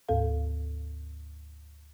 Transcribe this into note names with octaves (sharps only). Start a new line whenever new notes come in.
D2 G#2 A4 F5